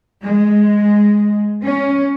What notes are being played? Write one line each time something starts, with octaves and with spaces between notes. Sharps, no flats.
G#3
C#4